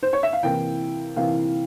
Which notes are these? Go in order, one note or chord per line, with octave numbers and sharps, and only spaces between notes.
C5
C#5
E5
F5
C3 E3 A#3 E4 G5
C3 E3 A#3 E4 F5